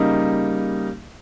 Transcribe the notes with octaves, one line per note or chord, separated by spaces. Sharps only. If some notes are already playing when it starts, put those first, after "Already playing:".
Already playing: C#3 G3 A#3 D#4